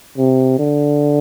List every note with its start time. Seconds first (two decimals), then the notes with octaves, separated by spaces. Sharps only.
0.18 C3
0.59 D3